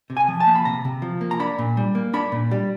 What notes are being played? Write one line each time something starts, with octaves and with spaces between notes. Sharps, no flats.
C3
G#5
F3
A5
A#3
B5
C3 A#5
C3
F3
A#3
A#5
D4 B5
A#2
G3
A#3
D4 B5
A#2
G3